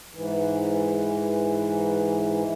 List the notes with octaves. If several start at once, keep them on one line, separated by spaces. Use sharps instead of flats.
G#2 E3